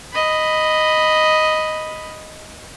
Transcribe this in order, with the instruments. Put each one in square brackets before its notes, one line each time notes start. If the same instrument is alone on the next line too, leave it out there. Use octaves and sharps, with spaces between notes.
[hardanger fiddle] D#5 B5